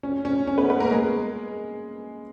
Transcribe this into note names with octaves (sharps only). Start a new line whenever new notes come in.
C#4
C#4
C#4
B3 B4
B3 B4
A#3 A#4
G#3 G#4